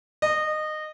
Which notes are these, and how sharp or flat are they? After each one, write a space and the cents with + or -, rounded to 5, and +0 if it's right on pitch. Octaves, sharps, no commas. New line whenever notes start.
D#5 -20